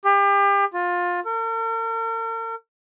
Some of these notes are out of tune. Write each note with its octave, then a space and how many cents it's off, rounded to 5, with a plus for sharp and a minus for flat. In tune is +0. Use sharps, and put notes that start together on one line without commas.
G4 +35
F4 +20
A#4 -45